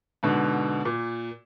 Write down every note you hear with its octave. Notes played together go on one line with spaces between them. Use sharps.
G#2 B2 D3
A#2